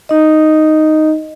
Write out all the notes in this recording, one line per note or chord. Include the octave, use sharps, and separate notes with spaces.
D#4 D#5